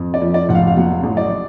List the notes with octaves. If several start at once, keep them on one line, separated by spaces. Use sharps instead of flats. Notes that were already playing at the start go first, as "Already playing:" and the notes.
Already playing: F2
D5
F3
D5
F1 F#5
F5
F5
F#3 F#5
A1
D5